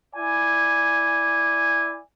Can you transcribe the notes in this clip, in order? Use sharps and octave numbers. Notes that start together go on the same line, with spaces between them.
E4 D5 G#5